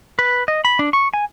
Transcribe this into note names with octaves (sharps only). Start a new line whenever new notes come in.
B4
D#5
B5
D4
C#6
G#5